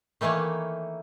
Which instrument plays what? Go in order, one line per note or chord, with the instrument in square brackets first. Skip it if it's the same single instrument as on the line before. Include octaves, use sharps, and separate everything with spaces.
[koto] D#3 E3 A3 A#3 C#5